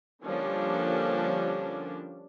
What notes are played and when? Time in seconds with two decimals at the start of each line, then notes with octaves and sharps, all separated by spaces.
0.24 D3 F3 G3 A#3 C#4 D4